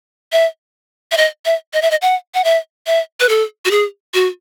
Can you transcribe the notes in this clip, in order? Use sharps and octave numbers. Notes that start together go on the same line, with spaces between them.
E5
E5
D#5
E5
D#5
E5
D#5
F#5
F#5
E5
E5
B4
A4
F#4
G#4
F#4